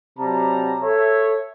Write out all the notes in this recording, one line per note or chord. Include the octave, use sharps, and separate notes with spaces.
C3 F#3 G3 A5 A#5
A4 C#5 E5